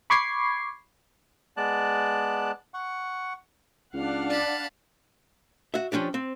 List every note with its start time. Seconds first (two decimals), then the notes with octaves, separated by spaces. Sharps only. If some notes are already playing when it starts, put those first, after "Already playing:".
0.10 B5 C#6 D6 G#6 C7
1.57 G#3 B3 D5 A5 F#6
2.74 F#5 C#6
3.94 C#2 D4 F5 F#5
4.30 D5 A5 B5
5.74 F#4 E5
5.92 F3 C#4 D4 G4
6.14 C4